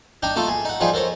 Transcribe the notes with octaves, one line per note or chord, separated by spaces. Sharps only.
D4 D#4 G5 A#5
A3 D#4 F4 A4
G#4
D#4 F#5
F3 G3 D#4 F4 G#4
A4 A#4 C5 C#5